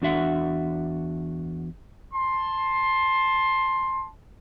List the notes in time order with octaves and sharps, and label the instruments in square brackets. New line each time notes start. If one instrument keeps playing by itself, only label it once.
[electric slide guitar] E2 D4 F#4 E5 F#5
[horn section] A5 C6